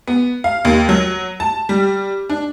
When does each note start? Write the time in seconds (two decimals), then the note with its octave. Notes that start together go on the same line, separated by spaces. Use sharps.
0.08 B3
0.44 F5
0.65 D#2
0.89 F#3
1.40 A5
1.69 G3
2.30 D4